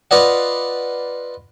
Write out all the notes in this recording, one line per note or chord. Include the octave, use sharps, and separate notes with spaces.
F4 B4 D5 D#5 F#5